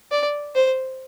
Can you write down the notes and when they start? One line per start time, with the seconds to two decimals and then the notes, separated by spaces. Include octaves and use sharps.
0.11 D5
0.55 C5